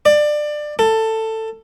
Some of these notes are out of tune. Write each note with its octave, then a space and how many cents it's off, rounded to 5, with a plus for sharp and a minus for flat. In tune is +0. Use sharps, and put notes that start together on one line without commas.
D5 +20
A4 +15